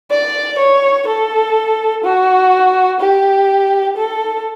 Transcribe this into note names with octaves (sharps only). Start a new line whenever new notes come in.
D5
C#5
A4
F#4
G4
A4